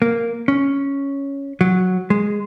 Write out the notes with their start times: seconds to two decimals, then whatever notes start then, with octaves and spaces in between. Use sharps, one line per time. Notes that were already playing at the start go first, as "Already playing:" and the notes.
0.02 A#3
0.48 C#4
1.61 F#3
2.10 G#3